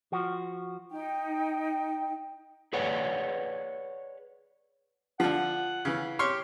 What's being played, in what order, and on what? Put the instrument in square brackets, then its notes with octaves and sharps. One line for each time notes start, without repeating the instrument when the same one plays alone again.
[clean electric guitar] F3 F#4
[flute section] D#4 G5
[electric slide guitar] G#4 B4 C#5 D5 F#5
[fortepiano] D3 F3 [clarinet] F#5
[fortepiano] C#3 E3
[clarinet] G4 [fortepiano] C#5 C6 F6